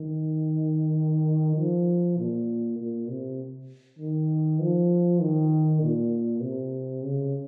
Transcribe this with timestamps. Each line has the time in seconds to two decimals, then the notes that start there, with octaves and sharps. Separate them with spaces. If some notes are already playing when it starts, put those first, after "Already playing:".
Already playing: D#3
1.56 F3
2.18 A#2
2.78 A#2
3.09 C3
3.99 D#3
4.60 F3
5.21 D#3
5.81 A#2
6.42 C3
7.03 C#3